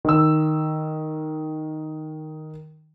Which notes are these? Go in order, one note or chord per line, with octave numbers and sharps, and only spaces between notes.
D#3 E6